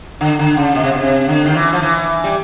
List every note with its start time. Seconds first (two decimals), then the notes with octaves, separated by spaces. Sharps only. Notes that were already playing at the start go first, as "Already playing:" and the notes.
0.21 D3
0.39 D3
0.57 C#3
0.75 B2
0.84 C3
0.91 B2
1.01 C3
1.28 D3
1.45 D#3
1.55 E3
1.73 F3
1.82 E3
2.24 G3